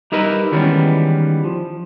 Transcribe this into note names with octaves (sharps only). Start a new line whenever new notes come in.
G3 D#4 E4 A#4 B4
D#3 E3 G3 G#3 B3 C#4
F3